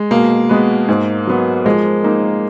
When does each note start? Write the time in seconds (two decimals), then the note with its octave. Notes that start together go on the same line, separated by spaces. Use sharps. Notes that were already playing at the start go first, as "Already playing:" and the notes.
Already playing: G#3
0.11 B2 A#3
0.49 G#3 B3 F#4 B4
0.89 G#2
1.27 F#3 B3
1.66 F3 G#3
2.04 A#3 D#4